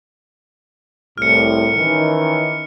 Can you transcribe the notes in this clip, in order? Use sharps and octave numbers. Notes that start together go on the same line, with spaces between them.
C2 A2 F6 C#7
D#3 E3 C#4